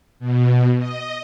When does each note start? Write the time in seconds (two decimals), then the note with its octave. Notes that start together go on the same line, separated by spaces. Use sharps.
0.19 B2
0.78 D#5